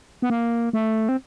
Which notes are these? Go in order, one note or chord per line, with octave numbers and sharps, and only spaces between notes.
B3
A#3
A3
C4